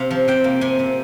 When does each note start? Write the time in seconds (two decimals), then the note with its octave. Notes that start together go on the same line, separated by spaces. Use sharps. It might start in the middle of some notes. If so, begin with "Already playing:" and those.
Already playing: C3 F5
0.11 F3
0.28 C3 G5
0.44 A#3
0.61 C3 G#5
0.79 C3